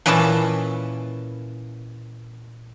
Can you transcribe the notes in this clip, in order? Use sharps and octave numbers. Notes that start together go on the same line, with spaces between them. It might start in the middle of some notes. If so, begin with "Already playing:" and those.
A#2 E3 C#4 E4 D#5 A5